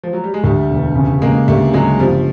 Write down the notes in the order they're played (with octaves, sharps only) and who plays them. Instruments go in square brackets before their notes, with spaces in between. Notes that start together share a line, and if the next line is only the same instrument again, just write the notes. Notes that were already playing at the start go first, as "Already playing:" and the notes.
[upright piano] F3
F#3
G3
G#3
[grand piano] D2 [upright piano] G3 A3
[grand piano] E1
C#3
[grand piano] C#3 [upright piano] G#3 A#3
[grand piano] D2 [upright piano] G3 A3
[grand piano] C#3 [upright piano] F#3 G#3
[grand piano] G1 [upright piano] F3 G3